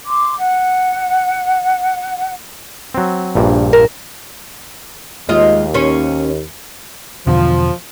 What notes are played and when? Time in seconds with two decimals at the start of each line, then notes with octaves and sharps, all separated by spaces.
0.06 C6 D6
0.38 F#5
2.95 F#3 C4
3.35 A#1 G2 A#2
3.73 A#4
5.29 D#2 G#3 F4 D#5
5.74 C#4 C5
7.27 E2 B2 D3 F3